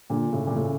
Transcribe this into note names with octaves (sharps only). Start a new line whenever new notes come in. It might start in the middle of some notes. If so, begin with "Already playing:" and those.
A#2 D3
A2 C#3
A#2
A2 C#3